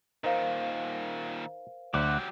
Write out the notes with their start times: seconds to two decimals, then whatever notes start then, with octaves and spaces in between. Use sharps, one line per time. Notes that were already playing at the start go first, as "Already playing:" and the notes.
0.24 A#2 D#3 D#4 A#4 C5 F5
1.94 D2 F#3 G4 F#5 D6